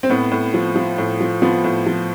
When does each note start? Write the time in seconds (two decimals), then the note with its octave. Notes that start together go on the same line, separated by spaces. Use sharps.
0.03 C4
0.10 A2 B3
0.31 A2
0.54 F3
0.76 F3
0.98 A2
1.21 F3
1.42 F3 B3
1.64 A2
1.87 F3